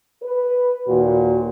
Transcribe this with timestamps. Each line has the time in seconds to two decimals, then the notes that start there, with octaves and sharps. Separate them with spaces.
0.22 B4
0.87 D#2 A#2 F#4